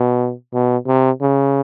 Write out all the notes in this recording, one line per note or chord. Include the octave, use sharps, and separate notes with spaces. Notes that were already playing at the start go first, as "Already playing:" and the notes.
Already playing: B2
B2
C3
C#3